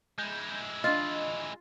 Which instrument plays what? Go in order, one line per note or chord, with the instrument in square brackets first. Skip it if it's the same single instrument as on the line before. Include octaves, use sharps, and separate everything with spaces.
[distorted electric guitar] G#3 E4 [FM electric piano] G6
[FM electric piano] D4 D#5 [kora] F4